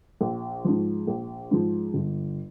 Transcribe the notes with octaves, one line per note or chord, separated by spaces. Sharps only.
A#1
G#2 F3
A#1
G#2 F3
G1